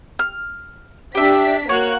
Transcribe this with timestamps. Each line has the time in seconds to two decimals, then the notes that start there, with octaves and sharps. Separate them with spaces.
0.19 F6
1.15 D4 G4 E5 B6
1.69 A#3 F#4 C#5 F#6